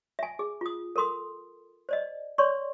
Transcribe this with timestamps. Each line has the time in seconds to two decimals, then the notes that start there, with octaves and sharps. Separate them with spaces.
0.19 E5 G#5
0.39 G#4
0.61 F4 D#6
0.96 A4 A#4 C6 D#6
1.89 C5 D5 D#5
2.38 C#5 D5 C6 C#6